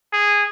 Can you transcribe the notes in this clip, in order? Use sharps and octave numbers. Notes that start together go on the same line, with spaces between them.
G#4